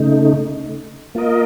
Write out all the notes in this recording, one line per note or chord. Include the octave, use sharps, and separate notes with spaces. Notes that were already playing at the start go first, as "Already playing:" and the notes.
Already playing: C#3 A3 D#4
A#3 F4 A#4 D#5